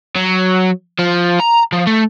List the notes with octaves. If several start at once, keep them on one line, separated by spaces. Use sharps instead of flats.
F#3
F3
A#5
F3
A3